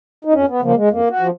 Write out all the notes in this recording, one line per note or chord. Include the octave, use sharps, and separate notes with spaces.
D#4
F2 C#4
B3
C#3 F3 A#3
G#3
F2 A#3
F#4
F3